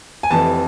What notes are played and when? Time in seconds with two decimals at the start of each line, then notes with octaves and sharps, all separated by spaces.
0.23 G#5
0.31 F1 F2 C3 E3 A5